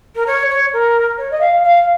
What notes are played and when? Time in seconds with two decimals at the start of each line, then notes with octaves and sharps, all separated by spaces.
0.15 A#4
0.27 C#5
0.50 C#5
0.73 A#4
1.18 C#5
1.31 D#5
1.40 F5
1.63 F5